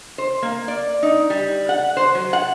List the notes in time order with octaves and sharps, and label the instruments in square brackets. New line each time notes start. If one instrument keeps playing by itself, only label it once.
[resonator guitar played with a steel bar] C5
A#3
D5
D#4
G3
F#5
C5
F#3
F#5